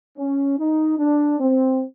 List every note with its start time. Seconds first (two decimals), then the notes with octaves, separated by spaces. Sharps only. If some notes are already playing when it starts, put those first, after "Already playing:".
0.17 C#4
0.59 D#4
0.99 D4
1.40 C4